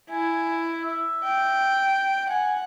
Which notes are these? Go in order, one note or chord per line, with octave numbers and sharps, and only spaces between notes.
E4 G#5
E5
G5
F#5 G#5